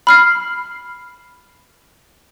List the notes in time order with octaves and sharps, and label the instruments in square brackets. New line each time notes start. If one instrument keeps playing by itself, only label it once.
[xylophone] B5 F6 C7